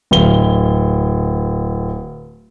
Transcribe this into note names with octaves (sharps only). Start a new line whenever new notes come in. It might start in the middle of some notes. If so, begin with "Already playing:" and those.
D1 G7